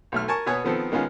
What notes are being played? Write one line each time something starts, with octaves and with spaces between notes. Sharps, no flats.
B1 A3 F6
A#4 G#5 A5 C#6
B2 B3 C#5 G#5 D#6
D#3 F3 B3 C4 A4
D#3 G#3 B3 C#4 F4